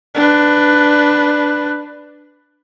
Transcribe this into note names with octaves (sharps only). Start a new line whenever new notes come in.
D4 B4